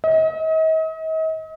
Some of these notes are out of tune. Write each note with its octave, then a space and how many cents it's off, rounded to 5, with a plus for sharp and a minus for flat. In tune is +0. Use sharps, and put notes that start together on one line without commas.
D#5 +40